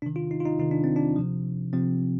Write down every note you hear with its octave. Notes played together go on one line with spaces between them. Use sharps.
C3 D#3 D4
F4
D#4
F4
D#4
C3 D#3 D#4
D4
C4
D4
C3 F3
C3 F3 C4